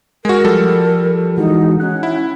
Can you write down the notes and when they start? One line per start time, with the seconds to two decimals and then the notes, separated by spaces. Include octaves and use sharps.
0.25 G#3 F#4 A#4 G#5
0.45 F3 G3 A4
1.38 E3 G#3 D#4 F#4
1.80 C#4 F#5
2.03 E4